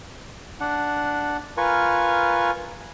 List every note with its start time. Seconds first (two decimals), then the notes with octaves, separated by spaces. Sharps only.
0.60 D4 F#5
1.57 F4 A#4 B4 G#5 C#6